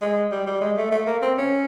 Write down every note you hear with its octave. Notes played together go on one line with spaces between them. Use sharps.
G#3
G3
G3
G#3
A3
A3
A#3
C4
C#4